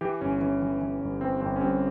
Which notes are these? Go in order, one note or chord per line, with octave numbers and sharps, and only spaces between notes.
E3 G4
G1 C#4
E3 C#4
E3
E3
G1
E3 C4
G1 C4
C#4
G2 C4